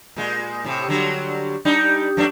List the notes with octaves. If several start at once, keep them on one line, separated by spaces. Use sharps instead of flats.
A#2 G#3
A2 C3
D3 F#3 G3
G3 D4 D#4
F2 A3 D4